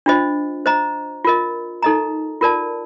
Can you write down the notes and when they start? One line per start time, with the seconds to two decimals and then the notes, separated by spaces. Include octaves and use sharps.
0.06 D4 F4 C5 D#5
0.66 C5 D#5 A#5
1.25 F4 A#4 D#5
1.83 D#4 A4 D#5 A#5
2.41 F4 A#4 D5 A5